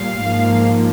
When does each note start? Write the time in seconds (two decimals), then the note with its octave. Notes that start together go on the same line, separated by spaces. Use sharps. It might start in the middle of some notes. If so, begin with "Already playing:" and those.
Already playing: A#2 G3 F5
0.25 G#2 F3 A#3